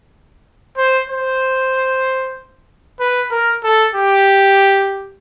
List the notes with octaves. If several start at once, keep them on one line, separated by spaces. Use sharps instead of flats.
C5
C5
B4
A#4
A4
G4